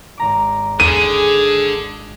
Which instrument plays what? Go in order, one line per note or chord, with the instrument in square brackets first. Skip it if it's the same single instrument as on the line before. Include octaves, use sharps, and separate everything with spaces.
[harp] G#1 A#5 D6
[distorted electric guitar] D3 [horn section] G#4 [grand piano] D#7